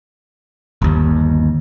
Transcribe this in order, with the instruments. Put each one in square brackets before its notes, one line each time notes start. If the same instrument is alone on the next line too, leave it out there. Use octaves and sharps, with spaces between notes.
[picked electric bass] G1 D#2